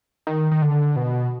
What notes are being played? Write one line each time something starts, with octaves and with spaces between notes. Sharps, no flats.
D#3
D#3
D3
B2